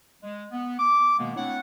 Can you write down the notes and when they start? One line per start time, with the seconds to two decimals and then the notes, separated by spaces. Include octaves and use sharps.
0.23 G#3
0.52 B3
0.79 D6
1.18 B2 D#3 G#3 A#3 B3
1.36 A3 C4 D4 E4 C#5 F#5